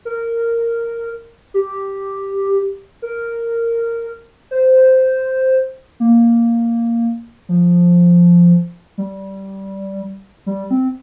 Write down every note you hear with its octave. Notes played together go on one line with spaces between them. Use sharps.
A#4
G4
A#4
C5
A#3
F3
G3
G3
C4